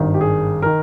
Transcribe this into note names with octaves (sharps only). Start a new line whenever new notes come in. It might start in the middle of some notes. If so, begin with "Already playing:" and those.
Already playing: G#1 G2 D#3
G4
G#4
D#3 A#4